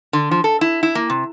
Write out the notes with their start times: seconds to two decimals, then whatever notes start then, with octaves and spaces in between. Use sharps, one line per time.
0.13 D3
0.31 F3
0.44 A4
0.61 E4
0.83 E4
0.95 A#3
1.10 C3